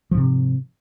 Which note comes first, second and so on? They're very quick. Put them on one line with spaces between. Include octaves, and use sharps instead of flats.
F3 G#2 C3